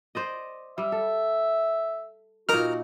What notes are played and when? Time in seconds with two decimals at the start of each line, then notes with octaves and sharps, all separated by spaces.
0.15 C5 D5 D#5
0.78 G3 E5
0.92 A4
2.49 A#2 D#4 F#4 A#4 F6